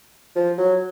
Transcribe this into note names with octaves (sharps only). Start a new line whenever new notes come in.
F3
F#3